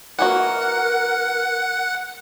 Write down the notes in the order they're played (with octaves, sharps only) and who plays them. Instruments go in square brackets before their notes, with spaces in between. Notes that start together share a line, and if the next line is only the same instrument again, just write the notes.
[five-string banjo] E3 A#3 F#4 [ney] A#4 [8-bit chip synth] F#5